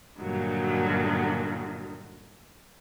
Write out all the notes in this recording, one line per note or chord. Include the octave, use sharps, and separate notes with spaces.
G2 A#2 D3 D#3 F#3